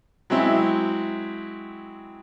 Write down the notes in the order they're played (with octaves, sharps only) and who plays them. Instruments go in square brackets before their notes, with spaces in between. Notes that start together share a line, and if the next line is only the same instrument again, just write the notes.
[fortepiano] F#3 G#3 C4 E4